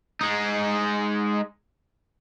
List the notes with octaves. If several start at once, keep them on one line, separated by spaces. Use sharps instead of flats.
G#3 D#4